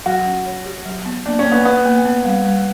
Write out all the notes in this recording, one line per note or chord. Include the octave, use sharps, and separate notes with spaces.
F#3 F#4
C#4
C#5
G4
F#3
B3
A#3 D4
C#4
A#3
B3
B3 B4
A#3
B3
G3
G3